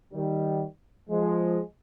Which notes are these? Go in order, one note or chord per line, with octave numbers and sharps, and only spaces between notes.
D#3 G3
F3 G#3